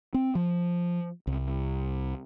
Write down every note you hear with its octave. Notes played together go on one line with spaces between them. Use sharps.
C4
F3
C2